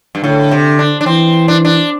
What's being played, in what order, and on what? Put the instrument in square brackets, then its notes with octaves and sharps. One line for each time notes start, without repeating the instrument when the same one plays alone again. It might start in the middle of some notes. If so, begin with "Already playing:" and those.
[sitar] G2
[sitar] A2 [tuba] D3
[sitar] C3
D4
D4
[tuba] E3 [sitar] C4
[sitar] D4
D4